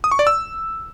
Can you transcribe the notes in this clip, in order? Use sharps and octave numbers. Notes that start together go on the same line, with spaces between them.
D#6
C#6
D5
E6